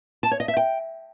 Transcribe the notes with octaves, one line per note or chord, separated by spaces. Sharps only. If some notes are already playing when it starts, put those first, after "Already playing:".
A5
C#5
D#5
E5
G5